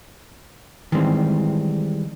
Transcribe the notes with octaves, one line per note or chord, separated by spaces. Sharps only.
D#3 E3 G3 G#3 C4